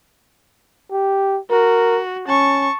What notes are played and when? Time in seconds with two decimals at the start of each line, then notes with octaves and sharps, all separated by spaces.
0.92 G4
1.50 F#4 A#4
2.28 C#4 A5 C#6